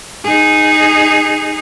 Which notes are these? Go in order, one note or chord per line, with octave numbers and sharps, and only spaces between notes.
D#4 G#4